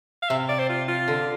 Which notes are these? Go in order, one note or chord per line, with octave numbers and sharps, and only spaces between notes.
F5
C3 E5
D5
C5
F4
F4
D3